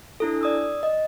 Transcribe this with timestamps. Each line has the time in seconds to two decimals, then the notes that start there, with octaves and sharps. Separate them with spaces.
0.20 D4 E4 A4
0.41 D5 D#6 E6
0.83 D#5